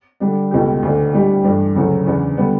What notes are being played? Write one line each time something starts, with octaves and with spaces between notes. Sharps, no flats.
D3 G3 D4
C#2 B2 A3 E4 G4
D2 D3 A3 D4
A2 G3 D4 G4
G2 E3 A3 D4
D2 C#3 F#3 A3 E4
E2 C#3 E3 B3 D4
D3 G3 B3